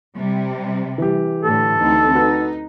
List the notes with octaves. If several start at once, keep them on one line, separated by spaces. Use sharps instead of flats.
C3 G3
E3 G4
A2 D3 A4
D2 C4 D#4
D#4 F#4 B4